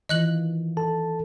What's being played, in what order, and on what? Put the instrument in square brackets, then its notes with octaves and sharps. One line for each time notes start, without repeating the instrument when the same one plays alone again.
[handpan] D#3 E3 F4 [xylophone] D#5 F#6 F#7
[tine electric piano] A4 A5